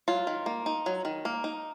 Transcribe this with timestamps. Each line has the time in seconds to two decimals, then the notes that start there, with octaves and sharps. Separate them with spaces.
0.08 F#3 F4
0.27 D#3
0.46 A#3
0.66 D#4
0.86 F#3
1.05 D#3
1.25 A#3
1.44 D#4